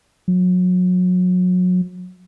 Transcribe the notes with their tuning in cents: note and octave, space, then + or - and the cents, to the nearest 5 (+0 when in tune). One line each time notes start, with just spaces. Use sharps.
F#3 -30